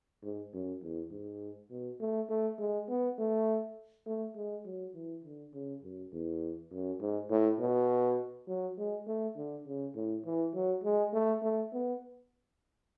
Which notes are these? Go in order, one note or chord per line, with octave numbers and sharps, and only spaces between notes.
G#2
F#2
E2
G#2
B2
A3
A3
G#3
B3
A3
A3
G#3
F#3
E3
D3
C#3
F#2
E2
F#2
G#2
A2
B2
F#3
G#3
A3
D3
C#3
A2
E3
F#3
G#3
A3
A3
B3